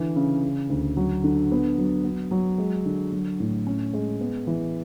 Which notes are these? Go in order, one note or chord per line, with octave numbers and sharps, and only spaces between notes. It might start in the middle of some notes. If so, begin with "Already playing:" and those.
Already playing: D3 E3
C#3
C#3
D2
F#3
D3
B3
F#3
B3
F#3
G#3
D3
F#3
A2
C#4
G#3
B3
E3